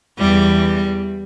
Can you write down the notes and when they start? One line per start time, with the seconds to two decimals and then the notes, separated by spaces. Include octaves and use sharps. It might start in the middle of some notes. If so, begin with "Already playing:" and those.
0.18 E2 E3 G3